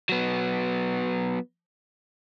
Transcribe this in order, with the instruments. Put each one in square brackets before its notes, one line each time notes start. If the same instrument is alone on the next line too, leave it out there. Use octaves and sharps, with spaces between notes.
[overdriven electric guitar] F#3 B3